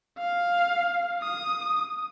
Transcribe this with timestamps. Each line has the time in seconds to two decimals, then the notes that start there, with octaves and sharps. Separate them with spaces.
0.18 F5
1.22 D#6